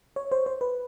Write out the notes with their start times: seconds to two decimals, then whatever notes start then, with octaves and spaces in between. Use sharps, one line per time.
0.16 C#5
0.32 C5
0.46 C5
0.61 B4